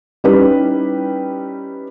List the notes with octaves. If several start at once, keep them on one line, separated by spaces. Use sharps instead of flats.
G3 C#4 D#4 E4 G4 B4